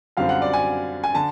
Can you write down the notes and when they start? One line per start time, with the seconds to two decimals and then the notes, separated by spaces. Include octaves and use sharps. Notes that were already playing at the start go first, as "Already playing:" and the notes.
0.17 F#2 D3 G3 C4 F4 F5
0.29 F#5
0.42 D5
0.53 G#5
1.04 G#5
1.15 D3 A5